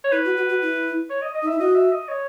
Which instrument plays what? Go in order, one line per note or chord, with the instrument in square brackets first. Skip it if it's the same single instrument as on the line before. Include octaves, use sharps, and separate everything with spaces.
[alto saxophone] C#5
[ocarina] E4 [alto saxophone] B4
[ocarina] F#4
F#4
F#4
E4
[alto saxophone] C#5
D#5
D#5
[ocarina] D#4
[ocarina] E4 [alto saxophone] E5
[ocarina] F#4 [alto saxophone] D#5
[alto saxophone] E5
D#5
C#5